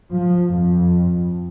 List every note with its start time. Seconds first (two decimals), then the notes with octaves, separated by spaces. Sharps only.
0.13 F3
0.55 F2